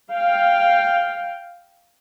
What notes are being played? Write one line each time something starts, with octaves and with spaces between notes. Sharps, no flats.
F5 G5